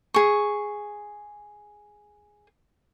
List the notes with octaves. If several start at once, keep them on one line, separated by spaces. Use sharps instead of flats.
G#4 C#6